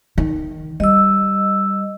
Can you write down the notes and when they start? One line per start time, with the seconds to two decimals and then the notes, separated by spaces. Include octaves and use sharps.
0.18 D#3
0.80 G3 D#5 E6